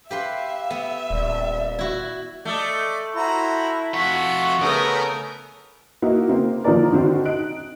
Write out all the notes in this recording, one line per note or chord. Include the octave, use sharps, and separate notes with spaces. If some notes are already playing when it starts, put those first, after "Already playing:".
G4 B4 E5 F5 C6
B3
D#1 D5
E4 F#4
A3 D5 D#5
E4 F#4 C5 A#5
F2 F4 F#4 E5 F#5 C#6
C#3 A3 B3 A4 A#4 D#6
A#3 D#4 E4 F#4
C#3 A#3 C4
D#3 F3 A#3 D4 A#4 D5
D3 D#3 C4 F#4
D#4 F#6 D7